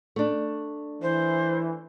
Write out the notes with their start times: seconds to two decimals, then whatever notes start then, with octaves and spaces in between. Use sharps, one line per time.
0.16 A3 D4
1.02 E3 C5